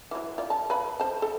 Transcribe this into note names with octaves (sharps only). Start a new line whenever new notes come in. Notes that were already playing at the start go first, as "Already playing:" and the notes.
E3 F#3
F4 D5
A5
B4 F5 B5
C5 A5
A4